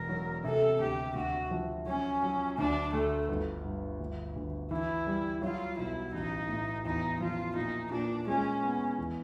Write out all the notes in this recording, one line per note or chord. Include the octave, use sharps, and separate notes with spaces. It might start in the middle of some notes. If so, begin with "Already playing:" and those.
Already playing: E1 A#4
F#3
C3 A4
D2 G4
D2 F#4
F3
F#3 C#4
F#3
D2 D4
D2 A3
G1
G2
D2
D2
E3 E4
G3
F#3 F4
B1 E4
A1 D#4
A2
E2 D#4
F3 F4
A#2 D#4
A#2 D4
G#3 C#4
B3
E2